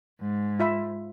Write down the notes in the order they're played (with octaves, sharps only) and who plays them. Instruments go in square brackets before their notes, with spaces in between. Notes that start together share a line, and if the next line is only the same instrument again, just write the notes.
[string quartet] G#2
[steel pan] F4 E5 B5